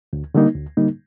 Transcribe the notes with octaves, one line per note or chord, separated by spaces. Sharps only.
D2
D3 G3 A#3 D#4
D2
D3 G3 A#3 D#4